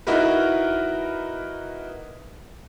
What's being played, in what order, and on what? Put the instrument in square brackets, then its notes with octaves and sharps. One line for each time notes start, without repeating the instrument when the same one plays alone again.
[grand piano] D#4 E4 F#4 A#4 B4